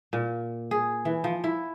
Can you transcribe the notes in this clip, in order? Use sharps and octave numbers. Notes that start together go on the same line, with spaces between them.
A#2
G#4
E3
F3
E4